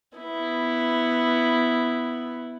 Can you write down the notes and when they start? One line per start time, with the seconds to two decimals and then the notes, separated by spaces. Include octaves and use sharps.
0.17 B3 E4